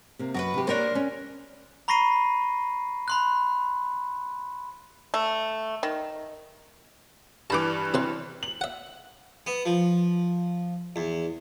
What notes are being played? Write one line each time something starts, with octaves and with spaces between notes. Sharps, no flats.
C3 A#3
F#2 F#4 A#4 B4
C3 G4
A#3 D4 G4 A#4 C5 C#5
C#4
A#5 B5 C#6 A#6 C7 D#7
B5 C6 F#6
A3
D#3
G2 E3 A5 B5 D6
C3 B4 C6
F#7
E5 F#5
B3
F3
E2